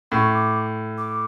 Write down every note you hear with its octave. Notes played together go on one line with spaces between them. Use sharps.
A2 C#6
D6
D6